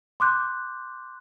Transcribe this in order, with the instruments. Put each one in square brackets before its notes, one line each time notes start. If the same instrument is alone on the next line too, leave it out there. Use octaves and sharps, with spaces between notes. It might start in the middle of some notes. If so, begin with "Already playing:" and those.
[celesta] C6 D6 F#6 G6